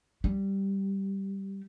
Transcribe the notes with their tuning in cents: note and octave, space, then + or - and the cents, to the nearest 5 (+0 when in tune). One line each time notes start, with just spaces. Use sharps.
G3 -5